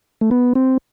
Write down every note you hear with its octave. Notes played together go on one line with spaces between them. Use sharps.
A3
B3
C4